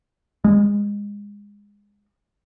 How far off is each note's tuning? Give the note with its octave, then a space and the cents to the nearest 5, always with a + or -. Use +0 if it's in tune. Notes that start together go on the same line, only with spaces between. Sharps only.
G#3 -25